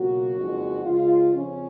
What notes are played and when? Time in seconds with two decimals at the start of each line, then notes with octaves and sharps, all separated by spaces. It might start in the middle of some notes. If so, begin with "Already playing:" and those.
Already playing: C#2 B2 F#3 A#3 F#4
0.35 F#1 F2 D#3 G#3
0.84 C#2 C#3 G#3 F4
1.34 F2 C#3 F3 C#4